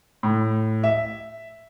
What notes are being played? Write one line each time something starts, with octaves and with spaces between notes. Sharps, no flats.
A2
E5